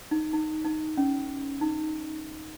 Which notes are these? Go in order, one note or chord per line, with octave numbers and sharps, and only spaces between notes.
D#4
D#4
D#4
C#4
D#4